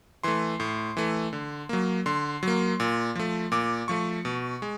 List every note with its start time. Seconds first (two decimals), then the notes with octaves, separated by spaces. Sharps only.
0.23 E3 A3 C6
0.60 A2
0.97 E3 A3
1.33 D3
1.69 F#3 A#3
2.06 D3 C6
2.43 F#3 A#3
2.80 A#2
3.15 F3 A3
3.52 A#2 D6
3.88 F3 A3 C#6
4.25 B2
4.62 G#3